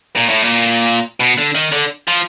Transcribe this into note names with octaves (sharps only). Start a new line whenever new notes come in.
A#2
A2
A#2
B2
D3
D#3
D3
F3